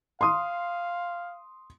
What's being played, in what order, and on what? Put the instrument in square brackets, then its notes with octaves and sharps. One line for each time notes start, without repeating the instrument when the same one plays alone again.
[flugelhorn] F5 [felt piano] C6 D#6